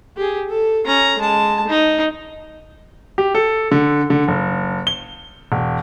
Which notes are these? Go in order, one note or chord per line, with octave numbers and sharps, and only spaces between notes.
G4 G#4
A4
C#4 A#5
G#3 A5
D#4
G4
A4
D3
D3
F#1
G7
E1